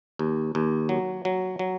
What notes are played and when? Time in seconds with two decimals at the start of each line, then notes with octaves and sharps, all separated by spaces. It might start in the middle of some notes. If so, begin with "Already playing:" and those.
0.19 D#2
0.55 D#2
0.89 F#3
1.25 F#3
1.59 F#3